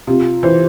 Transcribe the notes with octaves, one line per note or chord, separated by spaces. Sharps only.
C3 F4
E3 C5